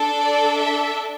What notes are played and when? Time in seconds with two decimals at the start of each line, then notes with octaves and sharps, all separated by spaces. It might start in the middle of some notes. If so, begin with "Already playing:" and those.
Already playing: D4 A4
0.20 D5
0.58 E5